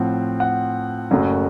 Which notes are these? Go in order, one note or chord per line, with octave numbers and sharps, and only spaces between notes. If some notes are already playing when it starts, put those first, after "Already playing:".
Already playing: A2 F3 C4 F#5
F#5
F#1 F#2 C#3 F#3 A3